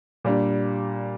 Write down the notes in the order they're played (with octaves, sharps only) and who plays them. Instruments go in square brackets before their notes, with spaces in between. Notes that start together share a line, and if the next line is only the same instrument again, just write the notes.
[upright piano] A#2 G3 D4